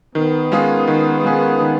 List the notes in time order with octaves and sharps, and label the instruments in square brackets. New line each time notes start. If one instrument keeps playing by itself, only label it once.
[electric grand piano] D#3 [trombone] B3
[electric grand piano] G#3 C#4 F4 G#4
D#3
G#3 C#4 F4 G#4
D#3